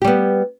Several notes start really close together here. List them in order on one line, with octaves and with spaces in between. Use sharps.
G4 G3 B3